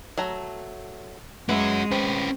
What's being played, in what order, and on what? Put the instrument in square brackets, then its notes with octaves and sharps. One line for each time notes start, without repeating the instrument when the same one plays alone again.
[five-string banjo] F#3 A3 A#5
[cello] G#3 [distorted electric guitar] C#4 F#4 [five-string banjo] B4 E5
[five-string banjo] C4 [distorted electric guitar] C#4 B4